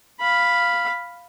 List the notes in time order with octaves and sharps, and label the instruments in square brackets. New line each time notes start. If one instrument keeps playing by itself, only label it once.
[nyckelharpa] F5 B5